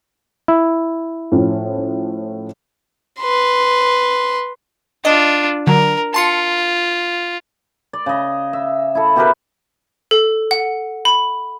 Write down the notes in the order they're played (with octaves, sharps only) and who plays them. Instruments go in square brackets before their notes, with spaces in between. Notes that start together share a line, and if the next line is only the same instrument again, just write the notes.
[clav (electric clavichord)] E4
[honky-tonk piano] A2 F3 C#4
[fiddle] B4 C6
[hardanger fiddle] D4 F4 [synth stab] D#5
[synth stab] D3 F#3 [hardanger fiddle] A#4
[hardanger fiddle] F4 [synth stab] A5 C6 C#7
[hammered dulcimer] D5
C#3 D#5
E5
E4 A4
B2 G4 A#4 B4
[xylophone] A4
F#5
B5